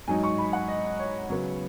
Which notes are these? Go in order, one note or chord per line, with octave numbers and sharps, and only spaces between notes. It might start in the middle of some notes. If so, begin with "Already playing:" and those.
G#2 F#3 D#4 G#5
C#6
B5
F#5
D#5
C#5
C#3 F#3 B3 C#5